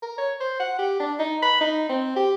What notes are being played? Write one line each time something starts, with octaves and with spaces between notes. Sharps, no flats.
A#4
C#5
C5
F#5
G4
D4
D#4
B5
D#4
C4
G4